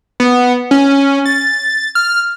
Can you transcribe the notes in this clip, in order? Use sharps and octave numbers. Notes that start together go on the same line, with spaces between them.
B3
C#4
A6
F6